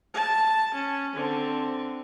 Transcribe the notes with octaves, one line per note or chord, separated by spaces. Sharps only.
A5
C#4
D3 C4